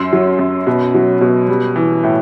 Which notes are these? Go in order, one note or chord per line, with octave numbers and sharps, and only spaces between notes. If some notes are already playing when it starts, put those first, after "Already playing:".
Already playing: F#2 C6 E6
F#3
F#2
B2
F#3
B2
G3
E3
A2